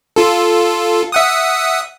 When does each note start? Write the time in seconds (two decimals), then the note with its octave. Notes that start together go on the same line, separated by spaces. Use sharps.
0.16 F4 A4
1.12 E5 F#5 D#6